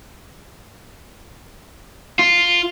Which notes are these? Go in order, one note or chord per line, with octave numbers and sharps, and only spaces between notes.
F4